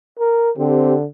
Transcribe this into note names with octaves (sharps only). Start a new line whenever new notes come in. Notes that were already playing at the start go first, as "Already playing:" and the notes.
A#4
D3 C4 G4